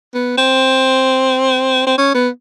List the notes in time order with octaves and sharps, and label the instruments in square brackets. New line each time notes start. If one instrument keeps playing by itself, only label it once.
[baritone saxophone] B3
C4
C4
C#4
B3